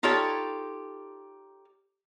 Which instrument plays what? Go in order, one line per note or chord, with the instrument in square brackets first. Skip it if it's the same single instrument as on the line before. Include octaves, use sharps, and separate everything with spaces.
[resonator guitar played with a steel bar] D#4 F4 G4 A4 C#5